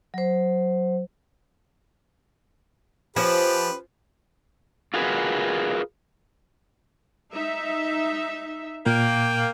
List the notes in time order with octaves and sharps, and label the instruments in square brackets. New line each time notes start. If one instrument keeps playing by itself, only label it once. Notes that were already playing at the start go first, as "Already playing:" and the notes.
[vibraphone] F#3 C5
[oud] F3 C#4 [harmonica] G4 B4
[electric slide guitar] F4 F#4 G#4 A#4 B4
[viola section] D#4 E5
[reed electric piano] A#2 [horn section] A#3 [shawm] G5